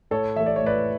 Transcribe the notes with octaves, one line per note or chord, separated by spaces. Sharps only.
A2 A4 C#5
E3 A3 E5
D5
C#5
A2 B4 D5